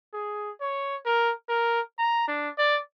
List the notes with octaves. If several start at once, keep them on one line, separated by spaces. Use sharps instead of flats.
G#4
C#5
A#4
A#4
A#5
D4
D5